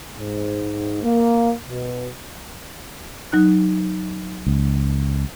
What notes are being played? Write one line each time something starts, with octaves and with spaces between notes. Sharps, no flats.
G#2
A#3
B2
F#3 D#4 F#6
C#2